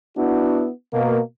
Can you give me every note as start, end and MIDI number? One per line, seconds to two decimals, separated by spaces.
0.18 0.68 59
0.18 0.68 62
0.18 0.68 64
0.18 0.68 66
0.93 1.20 47
0.93 1.20 58